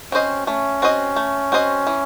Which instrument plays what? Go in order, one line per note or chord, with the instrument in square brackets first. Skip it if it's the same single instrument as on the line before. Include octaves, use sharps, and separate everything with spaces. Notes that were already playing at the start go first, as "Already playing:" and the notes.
[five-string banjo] C4 F#4 C5 D#5 [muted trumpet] C#4
[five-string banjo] A3 [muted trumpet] C#4
[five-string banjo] C4 F#4 C5 D#5
A3
C4 F#4 C5 D#5
E3